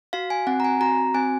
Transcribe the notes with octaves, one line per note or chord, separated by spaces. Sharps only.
F#4 F5
G#5
C4 F#5
A#5
G#5
F#4 A#5
C4 G#5